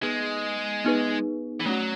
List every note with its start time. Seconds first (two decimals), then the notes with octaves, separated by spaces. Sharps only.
0.03 G#3 B3 D#4 G#4 B4
0.84 B3 D#4 G#4 B4
1.60 E3
1.65 F#3 A3 C#4 F#4